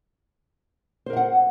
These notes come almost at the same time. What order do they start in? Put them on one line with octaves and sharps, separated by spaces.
C5 A#4 F5 F#5